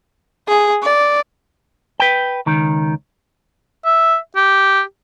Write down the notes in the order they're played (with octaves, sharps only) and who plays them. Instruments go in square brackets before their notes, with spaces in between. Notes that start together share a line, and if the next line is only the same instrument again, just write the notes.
[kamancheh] G#4
D5
[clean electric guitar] B4 G5
C#2 D#3
[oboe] E5
G4